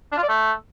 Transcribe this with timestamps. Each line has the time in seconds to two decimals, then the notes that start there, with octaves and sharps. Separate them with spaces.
0.12 D4
0.18 F4
0.23 D5
0.28 A3